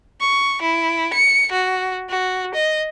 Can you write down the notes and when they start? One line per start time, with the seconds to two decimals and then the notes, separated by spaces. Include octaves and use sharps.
0.21 C#6
0.62 E4
1.14 C#7
1.52 F#4
2.10 F#4
2.55 D#5